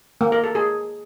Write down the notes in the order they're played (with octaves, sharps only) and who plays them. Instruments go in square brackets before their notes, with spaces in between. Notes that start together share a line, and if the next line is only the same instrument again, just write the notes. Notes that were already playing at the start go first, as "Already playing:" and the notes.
[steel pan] A#3
A#4
A4
G#4